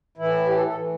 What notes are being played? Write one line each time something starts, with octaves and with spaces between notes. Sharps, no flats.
A2 E3 E4
G4
A4
A4
A2 E3